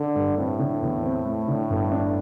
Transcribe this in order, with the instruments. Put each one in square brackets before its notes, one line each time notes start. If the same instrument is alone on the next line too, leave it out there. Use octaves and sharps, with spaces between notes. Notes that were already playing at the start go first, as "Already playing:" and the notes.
Already playing: [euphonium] D3
[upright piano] G2
[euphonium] A2 [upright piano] C4
[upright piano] D3
E2
C4
A3
D3
G1
D4